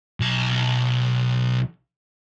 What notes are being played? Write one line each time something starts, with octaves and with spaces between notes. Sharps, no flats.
B1 A5